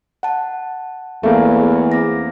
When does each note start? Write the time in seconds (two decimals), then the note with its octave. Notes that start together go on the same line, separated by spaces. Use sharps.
0.23 F#5 A5
1.23 E2 A3 A#3
1.92 C4 A#6